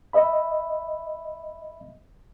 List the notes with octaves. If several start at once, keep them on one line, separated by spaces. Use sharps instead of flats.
D#5 E5 B5